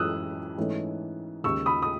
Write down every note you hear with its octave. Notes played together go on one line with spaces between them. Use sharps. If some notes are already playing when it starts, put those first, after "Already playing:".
Already playing: F#2 E3 G#3 C#4 D#6 E6 F#6
G#2 E3 A3 C#4
D#2 C#3 G#3 C#6 E6
B5 D#6
D#6